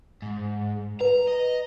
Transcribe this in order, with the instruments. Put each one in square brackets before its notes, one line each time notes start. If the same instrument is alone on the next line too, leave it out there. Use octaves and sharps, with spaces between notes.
[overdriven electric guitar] G#2
[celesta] B4 [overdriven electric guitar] A#5
[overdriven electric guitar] D#5